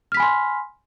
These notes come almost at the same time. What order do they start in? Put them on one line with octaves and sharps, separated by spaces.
F6 B6 B5 G#5 C6